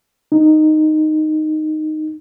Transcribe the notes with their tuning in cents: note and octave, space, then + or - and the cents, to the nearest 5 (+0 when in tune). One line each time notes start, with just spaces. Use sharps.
D#4 -10